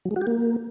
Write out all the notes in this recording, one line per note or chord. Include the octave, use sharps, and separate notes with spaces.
F#3
G#3
F#4
G4
A#3